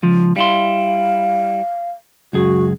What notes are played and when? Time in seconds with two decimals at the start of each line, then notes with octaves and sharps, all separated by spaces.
0.03 C#2 F3
0.36 G3 E4 F5 C6
2.33 C#2 F#2 F#4 G#4